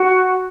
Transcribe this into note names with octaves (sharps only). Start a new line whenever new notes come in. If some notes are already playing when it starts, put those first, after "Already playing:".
Already playing: F#4